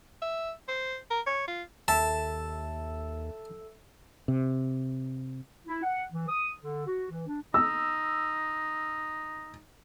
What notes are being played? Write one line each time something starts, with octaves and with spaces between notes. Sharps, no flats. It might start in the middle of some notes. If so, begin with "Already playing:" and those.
E5
C5
A#4
C#5
F4
D#2 A4 E5 A5 E6
C3
E4
F#5
E3
D#6
D3
F#4
E3
D4
D#4 E6